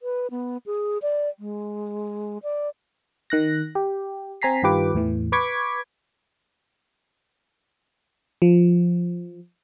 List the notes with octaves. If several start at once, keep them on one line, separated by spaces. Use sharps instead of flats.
B4
B3
G#4
D5
G#3
D5
D#3 F#6 A#6
G4
C4 G#5 A#5 B6 C7
G2 D#3 F4 G4 B4 D6
E2 A2 E3
B4 B5 C#6 D6 G#6 B6
F3